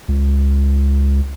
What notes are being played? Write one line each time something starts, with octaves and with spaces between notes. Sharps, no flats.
C#2